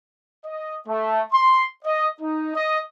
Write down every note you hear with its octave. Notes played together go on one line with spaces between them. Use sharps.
D#5
A3
C6
D#5
D#4
D#5